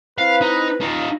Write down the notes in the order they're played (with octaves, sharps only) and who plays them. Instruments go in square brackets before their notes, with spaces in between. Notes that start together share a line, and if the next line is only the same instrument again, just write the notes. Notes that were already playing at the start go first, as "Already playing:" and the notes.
[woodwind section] C4 E4 B4 [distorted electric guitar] F5
[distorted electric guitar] D#4
D#4 F4